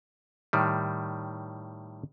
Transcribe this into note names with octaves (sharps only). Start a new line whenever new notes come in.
A2 D#3 G3